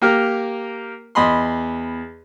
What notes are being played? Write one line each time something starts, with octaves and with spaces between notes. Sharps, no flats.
A#3 G4 A#4
E2 D#5 B5 C6